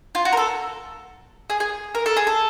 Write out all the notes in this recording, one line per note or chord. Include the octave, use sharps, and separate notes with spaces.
F4
F#4
A#4
A4
G#4
G#4
A#4
A4
G#4
A4